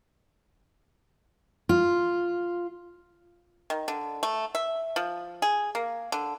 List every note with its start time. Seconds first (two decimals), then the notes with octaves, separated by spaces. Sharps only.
1.69 F4
3.70 D#3
3.88 D3
4.23 A3
4.55 E5
4.96 F3
5.42 G#4
5.75 A#3
6.12 D3